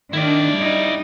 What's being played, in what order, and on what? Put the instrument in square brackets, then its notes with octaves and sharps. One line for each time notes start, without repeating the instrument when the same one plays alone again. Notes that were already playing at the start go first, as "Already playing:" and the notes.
[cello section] D#3 D4 [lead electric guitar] E4 D5
[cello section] G3 D#4